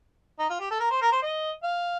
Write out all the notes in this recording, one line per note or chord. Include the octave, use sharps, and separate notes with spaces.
D#4
F4
G4
A4
A#4
C5
A#4
C5
D#5
F5